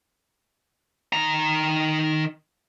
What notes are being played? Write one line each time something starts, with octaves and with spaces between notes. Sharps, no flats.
D#3 A#5